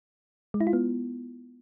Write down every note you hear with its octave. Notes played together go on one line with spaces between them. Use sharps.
G#3
E4
F4
B3